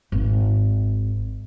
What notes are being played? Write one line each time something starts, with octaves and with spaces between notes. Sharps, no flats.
G#1